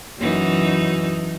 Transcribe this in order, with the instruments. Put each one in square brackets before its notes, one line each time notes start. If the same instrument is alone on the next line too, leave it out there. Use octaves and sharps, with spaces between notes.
[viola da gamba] F#2 E3 D#4